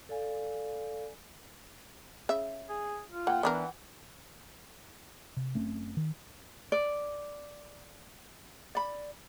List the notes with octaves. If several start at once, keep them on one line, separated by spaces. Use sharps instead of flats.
A4 D5 F5 G#5
C#3 E5
G#4
F4
A#3 F#5 G5
E3 B3 D4 A#4
C3
F#1 A3 C4 C#4
D#3
D5
D5 B5